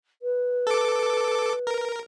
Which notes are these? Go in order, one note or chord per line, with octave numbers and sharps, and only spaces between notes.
B4
A4 D6
A#4